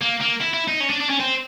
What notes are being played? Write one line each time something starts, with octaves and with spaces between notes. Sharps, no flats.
A#3
A#3
E4
E4
D#4
C#4
D4
D4
C#4
C4